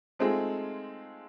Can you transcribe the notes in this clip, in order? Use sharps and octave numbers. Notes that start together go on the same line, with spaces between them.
G#3 A3 C4 D#4 F4 G#4